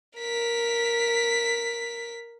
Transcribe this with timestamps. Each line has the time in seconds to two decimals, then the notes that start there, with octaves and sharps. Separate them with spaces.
0.19 A#4 B6